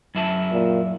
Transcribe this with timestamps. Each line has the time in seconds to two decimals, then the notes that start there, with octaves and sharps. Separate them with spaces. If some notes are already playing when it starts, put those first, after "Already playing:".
0.15 F#2 E4 A5
0.52 A#2